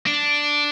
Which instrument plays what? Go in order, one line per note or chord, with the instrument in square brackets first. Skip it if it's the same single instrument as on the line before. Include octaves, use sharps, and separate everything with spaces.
[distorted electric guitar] D4